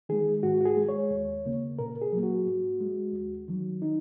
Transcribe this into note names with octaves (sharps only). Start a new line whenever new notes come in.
D#3 G#3 G#4
G#2 F#4
F#4
G#4
G#3
C#5
D#2
C#3 A#3
A#2 A#4
G#4
F#3 A#3
F#4
G#2
G#3
D#2
D#3 F#3
D#4